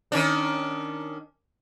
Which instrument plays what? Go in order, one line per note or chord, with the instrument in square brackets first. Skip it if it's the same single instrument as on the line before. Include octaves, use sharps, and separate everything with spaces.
[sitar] D#3 C#4 D4